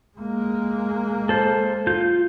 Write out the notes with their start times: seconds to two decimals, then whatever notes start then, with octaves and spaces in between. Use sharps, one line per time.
0.17 G#3 A#3
1.29 A4 C5
1.87 F4 G6